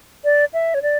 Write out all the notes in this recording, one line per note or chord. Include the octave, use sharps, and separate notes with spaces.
D5
E5
C#5
D5